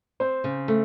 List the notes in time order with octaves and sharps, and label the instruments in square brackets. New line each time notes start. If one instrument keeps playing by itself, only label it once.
[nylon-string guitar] C4 [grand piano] C5
[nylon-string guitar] C#3
A3